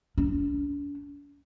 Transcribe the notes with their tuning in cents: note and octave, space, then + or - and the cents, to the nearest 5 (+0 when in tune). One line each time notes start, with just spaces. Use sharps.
D4 -45